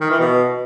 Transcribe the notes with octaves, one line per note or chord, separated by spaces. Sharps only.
D#3
E3
B2